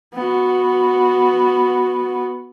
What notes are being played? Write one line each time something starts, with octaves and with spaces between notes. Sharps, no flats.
B3 F#4